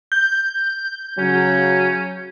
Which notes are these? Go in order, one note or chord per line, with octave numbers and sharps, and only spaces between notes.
G6
C#3 F#3 C#4